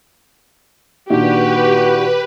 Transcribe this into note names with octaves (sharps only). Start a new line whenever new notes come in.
A#2 D#3 D4 F#4 G4 B4